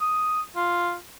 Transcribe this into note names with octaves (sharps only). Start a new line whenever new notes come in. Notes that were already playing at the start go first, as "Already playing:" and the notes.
D#6
F4